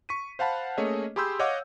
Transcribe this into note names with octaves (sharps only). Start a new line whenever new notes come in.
C#6 B6 D#7
C5 F5 F#5 A5 B5
A3 A#3 C#4 G#4 C#5 D#5
G4 G#4 B5 C6 E6 G6
C#5 D#5 F5 F#5 D6